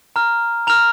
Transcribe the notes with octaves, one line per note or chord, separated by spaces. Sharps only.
A#5 F6
A#5 F6 F7